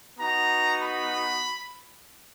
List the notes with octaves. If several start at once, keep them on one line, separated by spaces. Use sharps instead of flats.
B3 D#4 F#4 A#5
B5